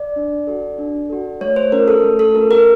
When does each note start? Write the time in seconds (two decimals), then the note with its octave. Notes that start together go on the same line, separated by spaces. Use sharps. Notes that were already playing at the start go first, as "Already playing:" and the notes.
Already playing: D5
0.16 D4
0.47 F#4 A4
0.78 D4
1.10 F#4 A4
1.41 A3 C#5
1.56 C5
1.72 C#4 F4 A#4
1.88 A4
2.04 A3
2.19 A4
2.35 C#4 F4 A#4
2.51 A#4